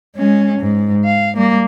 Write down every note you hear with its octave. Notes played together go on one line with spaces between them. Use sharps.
G#3 C#4
G#2
F5
G3 A#3